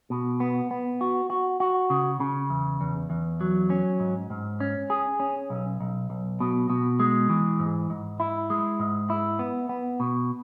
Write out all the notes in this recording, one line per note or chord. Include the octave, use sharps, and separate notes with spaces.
B2
B3
B3
F#4
F#4
F#4
C#3
C#3
E2
E2
E2
F#3
C#4
G#2
G#2
C#4
G#4
C#4
B1
B1
B1
B2
B2
G#3
E3
G#2
G#2
E4
G#3
G#2
E4
B3
B3
B2